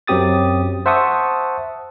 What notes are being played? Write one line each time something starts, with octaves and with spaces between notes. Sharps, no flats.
F#2 F#3 C4 G4 D#6 A6
C5 E5 F#5 A5 C#6 D#6